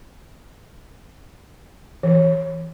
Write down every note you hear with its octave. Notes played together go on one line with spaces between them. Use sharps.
E3